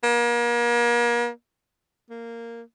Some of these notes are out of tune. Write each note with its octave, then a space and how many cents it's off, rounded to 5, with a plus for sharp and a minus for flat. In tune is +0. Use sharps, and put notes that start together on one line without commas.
A#3 +40
A#3 -10